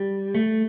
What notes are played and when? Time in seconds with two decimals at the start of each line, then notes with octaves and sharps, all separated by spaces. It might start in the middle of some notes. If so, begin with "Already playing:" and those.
Already playing: G3
0.35 A3